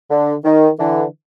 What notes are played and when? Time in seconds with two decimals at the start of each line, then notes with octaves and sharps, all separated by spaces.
0.10 D3
0.45 D#3
0.79 D3 E3